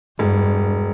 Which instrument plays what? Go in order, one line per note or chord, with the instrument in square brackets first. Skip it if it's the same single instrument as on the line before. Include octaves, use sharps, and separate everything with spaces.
[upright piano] E1 [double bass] G2